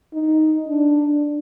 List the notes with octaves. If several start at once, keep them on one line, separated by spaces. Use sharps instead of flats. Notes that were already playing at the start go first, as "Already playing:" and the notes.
D#4
D4